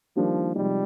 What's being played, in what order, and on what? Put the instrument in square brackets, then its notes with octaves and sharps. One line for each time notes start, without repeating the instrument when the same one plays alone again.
[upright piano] D#3 G3 A#3 D4 G4 [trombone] F3
[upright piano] C3 F3 G#3 D#4 [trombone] G3